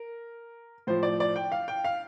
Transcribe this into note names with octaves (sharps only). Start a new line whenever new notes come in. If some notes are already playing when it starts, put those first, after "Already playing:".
Already playing: A#4
A2 F3 C5
D5
D5
G5
F5
G5
F5